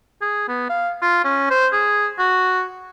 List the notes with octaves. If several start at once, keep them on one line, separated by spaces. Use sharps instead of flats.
G#4
B3
F5
F4
C#4
C5
G#4
F#4